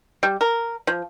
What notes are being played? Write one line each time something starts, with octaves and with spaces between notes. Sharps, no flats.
G3
A#4
F3